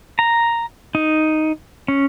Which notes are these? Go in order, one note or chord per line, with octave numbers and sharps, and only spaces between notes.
A#5
D#4
C#4